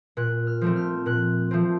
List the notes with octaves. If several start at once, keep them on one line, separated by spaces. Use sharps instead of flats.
A#2 F#6
F6
F3 A3 C4
F6
A#2 F#6
F3 A3 C4